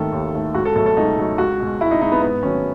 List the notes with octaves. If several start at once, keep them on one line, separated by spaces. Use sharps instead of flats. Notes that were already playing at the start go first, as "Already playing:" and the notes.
Already playing: D#2 D#3 A3 A4
D#2
D#3 A3
C#2 F#4
A4
B2 F#3 A3 A4
A4
C#2 D#4
B2 F#3 A3
C#2 F#4
B2 G#3
C#2 E4
D#4
B2 G#3 D#4
B3
G#2 B3
D#3 F#3 A3 C#4